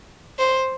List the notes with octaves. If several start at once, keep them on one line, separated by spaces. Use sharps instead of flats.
C5